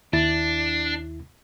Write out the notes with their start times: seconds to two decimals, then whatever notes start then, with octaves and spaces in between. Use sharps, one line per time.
0.13 D#2 D4 E4 A6